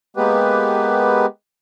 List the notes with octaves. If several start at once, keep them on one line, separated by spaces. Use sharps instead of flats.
G#3 A#3 B3 G4 B4